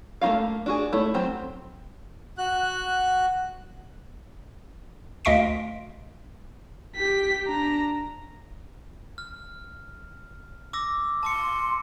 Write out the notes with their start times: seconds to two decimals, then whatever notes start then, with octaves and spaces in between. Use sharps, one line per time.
0.22 A3 A#3 D#4 F4 F5
0.66 D4 F#4 G#4
0.93 A3 E4 C#5
1.14 F#3 C4 G4
2.38 F#4 F#6
5.25 D2 D#5 F5 C6 B6 D7
6.96 G4 B6
7.46 D4 A#5
9.18 F6
10.73 D6 E6 A#6
11.23 A5 C6 D6 C#7